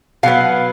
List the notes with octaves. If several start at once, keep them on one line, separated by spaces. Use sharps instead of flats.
B2 F#3 B3 F5